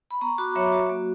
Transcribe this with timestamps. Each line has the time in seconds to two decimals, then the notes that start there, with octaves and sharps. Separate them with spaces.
0.11 B5
0.21 B3 A#5 C#6
0.38 F#4 B5 D6
0.55 F#3 C#5 E5
0.72 F#4
0.89 A#3